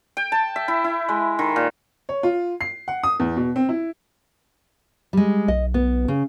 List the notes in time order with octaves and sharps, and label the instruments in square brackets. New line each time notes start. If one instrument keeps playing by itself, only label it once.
[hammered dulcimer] G5
A5
E5
E4
E4
G#3
D#3
A#2
[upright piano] C#5
F4
C7
F#5
D#6
E2
B2
C4
E4
[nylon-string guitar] G3 G#3
[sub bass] B1 [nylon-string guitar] D#5
[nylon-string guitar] B3
C#3